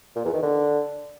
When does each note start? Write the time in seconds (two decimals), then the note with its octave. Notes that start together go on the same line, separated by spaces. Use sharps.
0.16 A#2
0.25 E2
0.34 D#3
0.42 D3